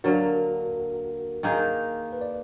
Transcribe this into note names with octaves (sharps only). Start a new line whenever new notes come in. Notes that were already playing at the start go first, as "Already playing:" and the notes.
D3 F#3 A#3 F#4 A#4
D#3 A#3 D#4 G#4
B4
D5